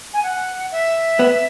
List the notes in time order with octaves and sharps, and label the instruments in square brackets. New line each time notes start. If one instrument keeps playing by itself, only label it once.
[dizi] G#5
F#5
E5
[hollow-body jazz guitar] B3